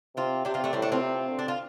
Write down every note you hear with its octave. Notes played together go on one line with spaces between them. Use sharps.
C3 C4 F4
C3 D4 G4
C4 F4
A3 D4
A2 G3 C4
A3 D4
C4 F4
C3
D3
D4
F4